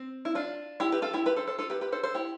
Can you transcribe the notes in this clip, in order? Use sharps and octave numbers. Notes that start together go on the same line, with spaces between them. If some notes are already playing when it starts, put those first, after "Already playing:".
Already playing: C4
E4
D4 F4
E4 G4
G4 B4
F4 A4
E4 G4
G4 B4
A4 C5
A4 C5
F4 A4
G4 B4
G4 B4
A4 C5
A4 C5
E4 G4